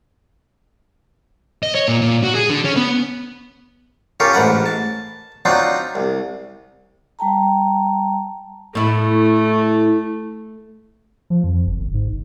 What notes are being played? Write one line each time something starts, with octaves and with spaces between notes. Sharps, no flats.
D#5
C#5
A#2
A#2
F#4
G#4
D3
C#4
B3
C#4 F4 G4 A4 A#4
A1 G#2 A#4 B4 F#5
A5
F#3 C4 D4 D#4 F4
C2
G3 G5 A5 A#5
A2 A3 E4
F3
F2
G1
G1
G#2
G1